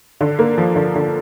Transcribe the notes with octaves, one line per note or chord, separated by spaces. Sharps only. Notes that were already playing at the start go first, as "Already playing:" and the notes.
D3
A#3
F3
D3
D3